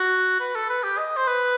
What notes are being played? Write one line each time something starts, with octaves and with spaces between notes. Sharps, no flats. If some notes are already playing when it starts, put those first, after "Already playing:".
Already playing: F#4
B4
A4
B4
G4
D#5
C5
B4